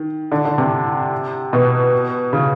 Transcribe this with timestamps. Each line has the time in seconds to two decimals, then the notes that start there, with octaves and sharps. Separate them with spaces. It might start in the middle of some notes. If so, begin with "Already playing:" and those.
Already playing: D#3
0.32 D3
0.45 D3
0.58 C3
1.53 B2
2.33 C#3